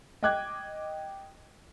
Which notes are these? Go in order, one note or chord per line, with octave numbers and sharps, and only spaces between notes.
D#5 G5 D6 F#6 G#6